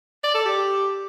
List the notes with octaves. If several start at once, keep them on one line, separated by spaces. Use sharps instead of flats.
D5
A4
G4